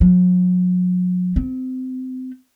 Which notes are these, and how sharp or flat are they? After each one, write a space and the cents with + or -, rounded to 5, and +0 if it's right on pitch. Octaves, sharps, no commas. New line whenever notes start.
F#3 -40
C4 -25